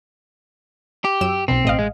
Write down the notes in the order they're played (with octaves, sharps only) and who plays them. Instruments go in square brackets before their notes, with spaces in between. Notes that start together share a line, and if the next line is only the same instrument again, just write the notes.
[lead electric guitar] G4
[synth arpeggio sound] F#2 E6 E7
[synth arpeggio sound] B1 B2 [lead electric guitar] C4
[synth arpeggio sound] A1 D#5 F5
[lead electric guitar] G#3